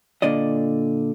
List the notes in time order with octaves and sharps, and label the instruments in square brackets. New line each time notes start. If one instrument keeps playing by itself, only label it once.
[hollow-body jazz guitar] A#2 D3 D5 D#5